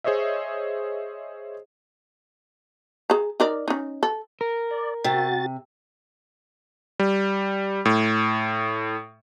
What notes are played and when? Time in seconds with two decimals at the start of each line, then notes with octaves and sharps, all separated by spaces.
0.04 G#4 C5 C#5 D#5 E5
3.10 G#4 A#5
3.40 D#4 A#4 D5
3.68 C#4 D#4
4.03 A4
4.41 A#4
4.71 D5
5.04 C3 F#4 A6
6.99 G3
7.85 A2